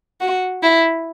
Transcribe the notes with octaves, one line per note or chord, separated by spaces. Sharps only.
F#4
E4